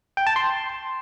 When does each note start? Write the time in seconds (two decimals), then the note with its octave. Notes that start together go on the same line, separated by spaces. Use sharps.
0.17 G5
0.27 A5
0.36 C6